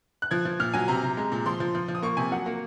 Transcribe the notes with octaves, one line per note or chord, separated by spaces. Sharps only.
F#6
F3 G#6
F3
A#2 F6
F#3 G#5
C3 A#5
C3
G#3
A#2
F3 C6
F3
F3
F3
D#6
A#3 C#6
C3 G#5
F#3 F#5
A#3